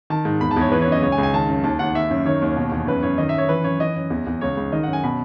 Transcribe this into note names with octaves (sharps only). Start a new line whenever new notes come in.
D#3 A5
G#2
E2 B5
A5
E2 C#5
E3 B4
C#5
F#2 D#5
C#2 C#5
G#5
C#2
G#5
D#3 A5
F#2
D#2 A5
D#2 F#5
D#3 E5
F#2
D#3 C#5
D#2
B2
E2
F#2 B4
F#2 C#5
D#3 D#5
E5
F#2 C#5
E3 B4
F#2 C#5
E3 D#5
F#2
E2
E2
C#2 C#5
C#2
D#3 D#5
F#2 F#5
G#5
B2 B5